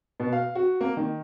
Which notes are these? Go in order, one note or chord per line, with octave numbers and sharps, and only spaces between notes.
B2
F5
F#4
A#3
D#3